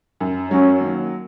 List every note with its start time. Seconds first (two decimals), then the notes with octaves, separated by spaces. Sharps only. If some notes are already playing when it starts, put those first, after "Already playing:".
0.20 F#2
0.50 F#3 C#4
0.80 D#2